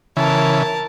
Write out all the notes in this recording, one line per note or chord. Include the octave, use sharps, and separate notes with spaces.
C#3 E3 A#4 A5